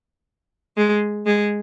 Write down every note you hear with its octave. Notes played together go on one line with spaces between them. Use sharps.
G#3
G#3